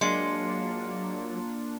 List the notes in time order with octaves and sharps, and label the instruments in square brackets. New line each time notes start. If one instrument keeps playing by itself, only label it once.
[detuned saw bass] F#3 [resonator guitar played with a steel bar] G#3 [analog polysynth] A#3 D4 F4 [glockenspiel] C6 C#7